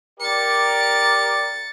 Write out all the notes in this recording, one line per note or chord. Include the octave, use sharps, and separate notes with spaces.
G4 A#4 D5 A6 C#7